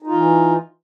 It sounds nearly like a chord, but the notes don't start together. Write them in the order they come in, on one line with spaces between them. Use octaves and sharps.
D#4 F4 E3